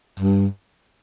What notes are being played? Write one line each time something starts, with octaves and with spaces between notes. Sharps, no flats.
G2